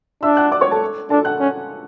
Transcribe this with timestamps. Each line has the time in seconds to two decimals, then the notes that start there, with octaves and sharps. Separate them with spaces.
0.23 D4 E5 E6
0.37 F#5 F#6
0.51 D5 D6
0.61 C#5 C#6
0.71 A4 A5
1.10 D4 A4 A5
1.25 F#5 F#6
1.40 C#4